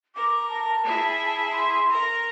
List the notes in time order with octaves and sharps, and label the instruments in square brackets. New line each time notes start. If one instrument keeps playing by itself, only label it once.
[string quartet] A#4 [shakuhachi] D6
[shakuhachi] A5
[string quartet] E4 G#4 E5
[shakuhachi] C6
[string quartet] A#4 A#5